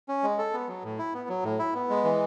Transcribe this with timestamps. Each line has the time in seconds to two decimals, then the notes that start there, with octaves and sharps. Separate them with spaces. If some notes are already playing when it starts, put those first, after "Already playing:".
0.08 C#4
0.23 G#3
0.38 A4
0.53 B3
0.68 F#3
0.84 A2
0.99 E4
1.14 B3
1.29 F#3
1.44 A2
1.59 E4
1.74 B3
1.90 G#3
2.04 E3